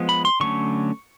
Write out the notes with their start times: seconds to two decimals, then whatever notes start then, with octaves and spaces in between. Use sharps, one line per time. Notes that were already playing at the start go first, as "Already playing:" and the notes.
Already playing: F3 G#3 B3
0.09 B5
0.25 C6
0.40 D3 F#3 A3 C#4 C#6